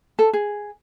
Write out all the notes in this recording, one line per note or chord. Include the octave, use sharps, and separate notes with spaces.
A4
G#4